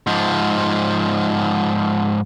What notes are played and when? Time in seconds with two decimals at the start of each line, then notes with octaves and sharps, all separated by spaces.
0.07 G#2 F3